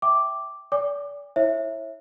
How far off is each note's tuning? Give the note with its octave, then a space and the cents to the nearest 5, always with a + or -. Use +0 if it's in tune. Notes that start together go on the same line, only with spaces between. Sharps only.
E5 +0 G5 +0 D6 +0
D5 -35 G#5 -45 D6 +30
E4 -10 C#5 -30 E5 +0